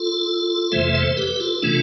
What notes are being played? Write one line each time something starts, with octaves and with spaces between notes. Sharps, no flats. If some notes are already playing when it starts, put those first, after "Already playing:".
Already playing: F4 A4
F2 C3 E3 A3 C5 E5
A4 C5
G4 B4
F4 A4
C3 E3 A3 D4 F4